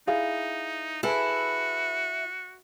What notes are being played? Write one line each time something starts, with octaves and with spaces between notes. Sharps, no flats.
D#4 E4 G#4 F5
E4 F#4 G#4 A4 B4